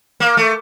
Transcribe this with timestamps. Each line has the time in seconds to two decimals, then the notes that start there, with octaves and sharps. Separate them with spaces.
0.20 A#3
0.37 A3